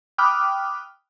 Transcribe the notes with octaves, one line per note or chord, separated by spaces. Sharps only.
G5 B5 D6 D#6 F6 F#6